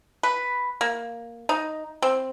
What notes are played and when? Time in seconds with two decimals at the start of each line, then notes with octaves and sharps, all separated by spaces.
0.23 B4
0.81 A#3
1.49 D#4
2.02 C4